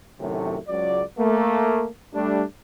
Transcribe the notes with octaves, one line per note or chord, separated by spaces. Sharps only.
F#2 A2 C3 D#3 F#3 A3
C#2 F#3 D5
A3 A#3
G3 A3 D4